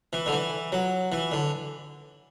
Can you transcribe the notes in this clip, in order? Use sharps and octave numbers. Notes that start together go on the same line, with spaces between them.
E3
D3
E3
F#3
E3
D3